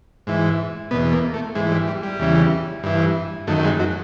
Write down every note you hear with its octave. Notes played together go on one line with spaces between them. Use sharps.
G#2 E3
E2 B2 B3
A#3
A3
G#2 E3 G#3
G3
G3
G3
E2 C#3 E3
G2 E3
F#2 D#3 A3
G#3
F#3